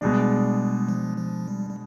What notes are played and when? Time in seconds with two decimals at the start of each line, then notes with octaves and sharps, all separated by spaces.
0.01 B2 G3 G#3 D4
0.89 F3
1.17 F3
1.48 G3
1.70 G3